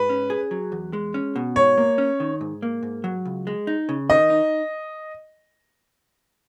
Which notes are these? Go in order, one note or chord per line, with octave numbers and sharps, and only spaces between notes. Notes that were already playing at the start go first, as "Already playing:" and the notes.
Already playing: G#2 B4
C#4
G#4
F#3
E2
G#3
C#4
B2
G#2 C#5
A#3
C#4
D#3
G#2
A#3
G#2
F#3
C#2
G#3
D#4
C#3
D#3 D#5
D#4